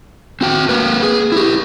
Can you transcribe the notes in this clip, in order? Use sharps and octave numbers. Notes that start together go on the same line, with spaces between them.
C4 F#4 G5
A#3 A#4 B4
G#4
E4 G4